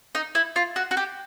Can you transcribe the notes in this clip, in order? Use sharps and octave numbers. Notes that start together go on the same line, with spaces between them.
D#4
E4
F4
F#4
F#4
G4